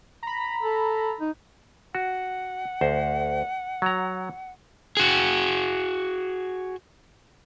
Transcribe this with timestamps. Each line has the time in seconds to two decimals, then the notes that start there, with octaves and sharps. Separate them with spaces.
0.23 A#5 B5
0.63 A4
1.20 D#4
1.95 F#4 F#5
2.81 D2 C5
3.82 F#3 A#5
4.97 F#4 G#4